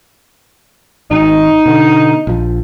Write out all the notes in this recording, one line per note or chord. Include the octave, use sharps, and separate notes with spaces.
G#1 D#4
B2 D3
A#1 F3